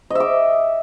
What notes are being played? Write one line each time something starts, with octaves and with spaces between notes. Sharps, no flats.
D#5 E5 D6